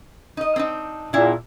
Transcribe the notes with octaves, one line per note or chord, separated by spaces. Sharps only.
D#4 D#5
C4 D4 D#4
E2 A#2 D4 E4